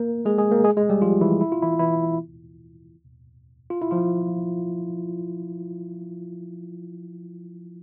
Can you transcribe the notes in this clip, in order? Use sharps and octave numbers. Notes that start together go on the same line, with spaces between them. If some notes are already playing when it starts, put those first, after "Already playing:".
Already playing: A#3 A#4
G#3 G#4
G#3 G#4
A#3 A#4
G#3 G#4
G#3 G#4
G3 G4
F3 F4
E3 E4
E4
F4
E3 E4
E3 E4
F4
E4
F3 F4